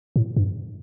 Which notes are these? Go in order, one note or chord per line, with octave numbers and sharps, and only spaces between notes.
A2
G2